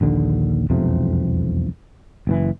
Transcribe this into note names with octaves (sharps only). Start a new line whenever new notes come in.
A#1 D#2 D3
E1 B1 F2 C3
F#1 B2 E3